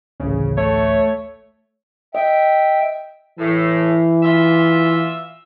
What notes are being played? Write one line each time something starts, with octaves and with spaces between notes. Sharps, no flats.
A1 D2 C#3
A3 C#5
D#5 E5 G5
A2 E3
A#2 F4 E5